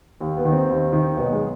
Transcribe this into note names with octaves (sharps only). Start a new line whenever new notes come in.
D#2
B3
D#3
C4
D#2
D#3
B1 B3
G#3